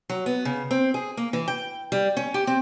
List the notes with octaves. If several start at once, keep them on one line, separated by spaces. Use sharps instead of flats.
F#3
B3
C#3
C4
G#4
A#3
E3
G5
G3
C#4
G4
C4